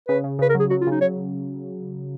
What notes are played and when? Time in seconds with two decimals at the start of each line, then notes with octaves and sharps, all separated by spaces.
0.08 C#3 B4
0.24 C#3
0.39 C#3 B4
0.50 A#4
0.55 F#3
0.60 G#4
0.70 F#3 F#4
0.81 F4
0.87 C#3 D#4
1.01 F#3 C#5